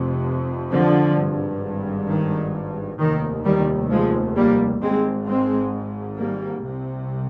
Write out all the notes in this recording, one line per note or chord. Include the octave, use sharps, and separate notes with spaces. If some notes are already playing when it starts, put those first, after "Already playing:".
Already playing: F1 F2 C3
D3 F3
G#1 G2
D#3
F1 D#2 D#3
D#3 G3
F3 G#3
G3 A#3
G#1 G#2 G#3 C4
G#3 C4
G3 A#3
C2 C3